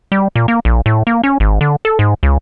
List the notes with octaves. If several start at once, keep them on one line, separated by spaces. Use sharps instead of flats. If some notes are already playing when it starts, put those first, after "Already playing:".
G3
A#2
A#3
A#1
A2
A#3
C#4
G#1
D3
A4
G#2
C#2